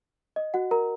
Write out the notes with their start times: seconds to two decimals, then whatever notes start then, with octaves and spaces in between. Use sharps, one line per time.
0.36 D#5
0.54 F#4 F#5
0.71 A#4 A#5